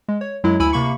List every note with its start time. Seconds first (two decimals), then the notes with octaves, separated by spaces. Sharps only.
0.08 G#3
0.21 C#5
0.44 F#2 F#3 G#3 E4
0.59 D2 E4 G#5 B5 E6
0.72 C3 A#3 B5 C#6 C#7